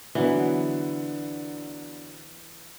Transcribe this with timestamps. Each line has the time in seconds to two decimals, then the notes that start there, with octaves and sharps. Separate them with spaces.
0.15 D3 E3 F#3 B3